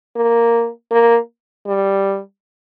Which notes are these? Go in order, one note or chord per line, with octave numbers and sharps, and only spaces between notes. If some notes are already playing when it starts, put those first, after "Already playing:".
A#3
A#3
G3